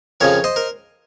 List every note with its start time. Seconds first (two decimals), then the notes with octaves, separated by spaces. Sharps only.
0.21 F2 C#3 F3 A#4 C#5
0.44 C5 D#5
0.56 A#4